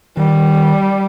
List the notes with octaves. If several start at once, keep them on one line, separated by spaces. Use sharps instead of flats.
D#3 G3